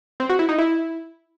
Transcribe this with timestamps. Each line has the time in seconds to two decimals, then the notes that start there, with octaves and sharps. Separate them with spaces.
0.20 C4
0.29 F#4
0.39 E4
0.49 D#4
0.58 E4